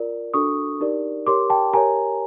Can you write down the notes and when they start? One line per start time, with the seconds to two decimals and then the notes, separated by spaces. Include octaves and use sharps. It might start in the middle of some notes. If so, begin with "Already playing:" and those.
Already playing: F4 A#4 D5
0.34 D4 F#4 A4 C#6 D#6
0.81 D#4 G4 A#4 D5
1.27 G4 A#4 C#5 C6 D6
1.50 G5 A5
1.73 G4 A#4 C#5 G#5 A#5